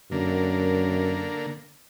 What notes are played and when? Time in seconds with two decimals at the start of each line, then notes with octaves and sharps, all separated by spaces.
0.12 F#2 D3 A#3